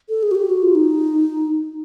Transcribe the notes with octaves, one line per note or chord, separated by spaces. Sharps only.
A4
G#4
F#4
G4
F#4
F4
D#4